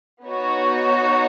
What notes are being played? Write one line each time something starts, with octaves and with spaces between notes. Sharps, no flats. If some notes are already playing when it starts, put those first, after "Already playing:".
B3 D#4 F#4 C#5